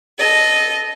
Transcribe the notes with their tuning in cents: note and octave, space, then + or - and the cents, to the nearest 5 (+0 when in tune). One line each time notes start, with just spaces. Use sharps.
A4 -20 D#5 +0